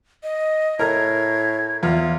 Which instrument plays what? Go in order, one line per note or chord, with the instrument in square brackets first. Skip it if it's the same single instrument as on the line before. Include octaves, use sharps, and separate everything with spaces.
[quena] D#5
[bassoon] A2 [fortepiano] A#4 A#5 [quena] G#6
[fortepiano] E2 [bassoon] F4